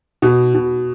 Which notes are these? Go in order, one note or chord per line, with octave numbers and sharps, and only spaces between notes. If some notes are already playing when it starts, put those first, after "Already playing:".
B2
B2